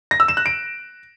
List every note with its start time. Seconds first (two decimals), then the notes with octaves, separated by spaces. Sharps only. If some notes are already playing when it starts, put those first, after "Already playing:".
0.11 A#6
0.20 E6
0.28 E7
0.37 F#6
0.46 D7